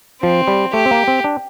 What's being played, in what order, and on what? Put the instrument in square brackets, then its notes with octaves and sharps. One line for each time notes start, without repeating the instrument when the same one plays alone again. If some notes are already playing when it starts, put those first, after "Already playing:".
[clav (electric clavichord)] F3 [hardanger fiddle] C4
[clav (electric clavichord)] G3
[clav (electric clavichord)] A3 [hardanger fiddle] G4
[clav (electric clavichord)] C4
A#3
C4
D4